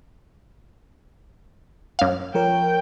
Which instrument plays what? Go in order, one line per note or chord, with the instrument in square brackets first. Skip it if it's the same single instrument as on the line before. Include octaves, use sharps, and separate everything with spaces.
[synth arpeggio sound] F#2 F5
[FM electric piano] F3 A#4 C#5 [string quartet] G5